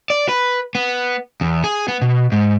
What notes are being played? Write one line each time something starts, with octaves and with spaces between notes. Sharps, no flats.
D5
B4
B3
E2
G#4
B3
B2
G#2